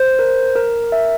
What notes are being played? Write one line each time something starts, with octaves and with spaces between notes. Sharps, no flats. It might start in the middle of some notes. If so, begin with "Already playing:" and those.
Already playing: C5
A#4
A#4
E5